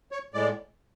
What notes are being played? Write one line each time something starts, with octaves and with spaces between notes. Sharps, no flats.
C#5
A2 G#3 D5